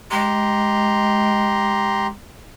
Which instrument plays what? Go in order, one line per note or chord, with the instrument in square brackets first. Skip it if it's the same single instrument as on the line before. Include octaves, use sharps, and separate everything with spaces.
[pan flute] G#3 [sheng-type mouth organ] G4 A#5 C6